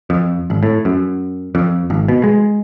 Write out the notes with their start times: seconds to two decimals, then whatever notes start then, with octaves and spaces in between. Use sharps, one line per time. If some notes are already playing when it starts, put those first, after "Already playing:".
0.10 F2
0.50 G#1
0.63 A2
0.85 F#2
1.55 F2
1.90 G#1
2.08 B2
2.24 G#3